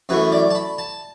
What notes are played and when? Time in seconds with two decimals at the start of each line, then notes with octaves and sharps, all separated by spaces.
0.09 F#2 E3 A3 B4
0.32 D5
0.50 A5
0.55 B5
0.78 A5